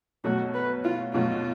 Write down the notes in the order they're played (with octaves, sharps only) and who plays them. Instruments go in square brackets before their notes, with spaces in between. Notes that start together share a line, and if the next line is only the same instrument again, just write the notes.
[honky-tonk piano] B2 F#3 A3 [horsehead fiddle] F#4
[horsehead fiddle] B4
F4
[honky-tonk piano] B2 F#3 A3 [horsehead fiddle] F4